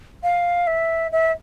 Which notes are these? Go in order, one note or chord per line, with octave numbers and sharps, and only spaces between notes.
F5
E5
E5